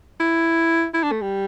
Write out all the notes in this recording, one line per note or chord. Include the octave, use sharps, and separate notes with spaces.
E4
E4
D4
A3
G3